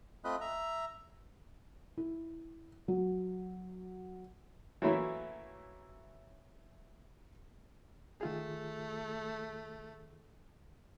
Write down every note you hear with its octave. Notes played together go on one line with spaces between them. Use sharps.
A3 C4 F4 D#5 B5 F#6
E5 A#5
E4
F#3
E3 F#3 A3 A#3 C#4 E4
D#3 A3 F4 G#4